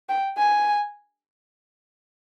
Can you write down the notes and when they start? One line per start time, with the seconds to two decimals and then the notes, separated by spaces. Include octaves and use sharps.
0.09 G5
0.37 G#5